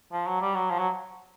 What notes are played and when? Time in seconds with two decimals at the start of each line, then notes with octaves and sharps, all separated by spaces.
0.12 F3
0.27 F#3
0.41 G3
0.55 F#3
0.70 F3
0.79 F#3